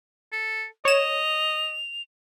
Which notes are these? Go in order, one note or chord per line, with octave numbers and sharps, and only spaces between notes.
A4
C#5 D#5 E7 F7